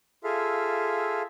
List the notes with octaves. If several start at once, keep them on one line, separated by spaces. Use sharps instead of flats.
F4 G#4 A4 E5 F5